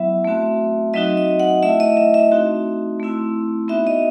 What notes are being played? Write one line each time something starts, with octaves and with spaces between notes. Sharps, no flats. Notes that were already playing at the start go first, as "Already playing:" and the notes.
Already playing: F#3 B3 E4 E5
A3 C4 F#4
F#3 C4 D#4 F#4 D#5
D#5
F#5
A3 E4 E5
D#5
E5
E5
A3 C4 D#4 F#4
A3 C4 E4
B3 D#4 F#4 E5
D#5